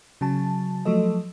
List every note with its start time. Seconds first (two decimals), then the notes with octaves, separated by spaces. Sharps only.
0.21 C#3 F#3 A5
0.85 F3 F#3 A3 A4 D#5